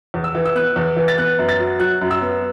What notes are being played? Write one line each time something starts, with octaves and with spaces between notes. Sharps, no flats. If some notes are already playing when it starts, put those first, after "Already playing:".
E2
E6
E3
E6
B3 F#6
E2
E3
A6
B3 F#6
F#2
A6
F#3
F#3 F#6
F#2
E6
B3